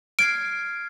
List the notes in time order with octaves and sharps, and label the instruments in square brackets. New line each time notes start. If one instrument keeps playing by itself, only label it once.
[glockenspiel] F6 G#6 C7 [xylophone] D7